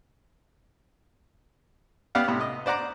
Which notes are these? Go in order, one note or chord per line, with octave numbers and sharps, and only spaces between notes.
B3 G4 D5 F5 F#5
A2 C3 B3
D#5
C5 D5 F#5 A#5 D6